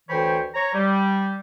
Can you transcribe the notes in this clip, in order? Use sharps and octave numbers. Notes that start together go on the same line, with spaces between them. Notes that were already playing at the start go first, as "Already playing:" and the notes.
D2 E3 C5 C#5 G5 B5
C#5 A#5
G3